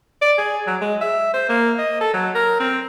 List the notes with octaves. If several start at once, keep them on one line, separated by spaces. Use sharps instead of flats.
D5
G#4
F#3
G#3
E5
C5
A#3
D#5
A4
F#3
A#4
C4